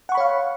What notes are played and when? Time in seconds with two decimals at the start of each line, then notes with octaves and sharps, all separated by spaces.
0.09 F#5
0.12 C#6
0.15 B5
0.17 C#5
0.20 F5